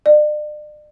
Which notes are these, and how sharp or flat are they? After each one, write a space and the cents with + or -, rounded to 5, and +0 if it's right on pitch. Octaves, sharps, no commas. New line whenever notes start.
D5 +40